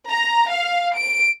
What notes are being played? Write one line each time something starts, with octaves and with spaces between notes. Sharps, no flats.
A#5
F5
D7